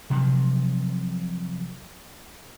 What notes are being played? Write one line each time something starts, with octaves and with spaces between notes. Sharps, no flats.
C3 F3 F#3